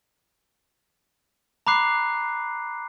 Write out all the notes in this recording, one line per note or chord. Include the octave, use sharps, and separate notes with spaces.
A#5 B5 D6 F#6 C7